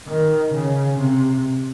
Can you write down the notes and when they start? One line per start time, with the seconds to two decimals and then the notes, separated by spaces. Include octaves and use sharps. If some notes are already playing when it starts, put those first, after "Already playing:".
0.08 D#3
0.53 C#3
0.98 C3